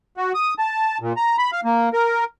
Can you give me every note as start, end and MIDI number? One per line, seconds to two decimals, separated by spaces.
0.17 0.32 66
0.34 0.54 87
0.59 0.98 81
1.01 1.13 46
1.17 1.36 82
1.38 1.51 83
1.52 1.60 77
1.65 1.89 58
1.93 2.24 70